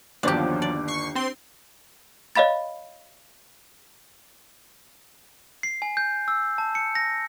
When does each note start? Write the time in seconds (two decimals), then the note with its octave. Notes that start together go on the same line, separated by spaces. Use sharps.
0.23 G1 D#2 F3 F#3 D4 G4 D6
0.62 D5
0.88 C#6 C7
1.15 C4 C6
2.35 C#5 D#5 F5 B5 A6
5.63 C7
5.82 G#5
5.97 G6
6.28 E6
6.58 A5
6.75 C#7
6.95 A#6